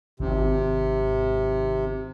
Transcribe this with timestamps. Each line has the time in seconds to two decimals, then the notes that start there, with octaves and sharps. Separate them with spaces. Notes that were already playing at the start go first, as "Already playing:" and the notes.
0.20 G#1 C3